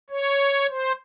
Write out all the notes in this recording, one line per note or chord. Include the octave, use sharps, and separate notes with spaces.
C#5
C5